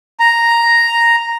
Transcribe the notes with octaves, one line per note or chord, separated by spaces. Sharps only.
A#5